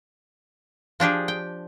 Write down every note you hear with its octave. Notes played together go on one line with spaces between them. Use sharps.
F3 D4 G4 G#4
G5